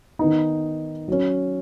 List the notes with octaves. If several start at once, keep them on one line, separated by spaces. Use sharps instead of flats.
D#3 B3 D#4
F#3 C#4